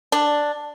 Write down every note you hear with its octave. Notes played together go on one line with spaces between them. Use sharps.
D4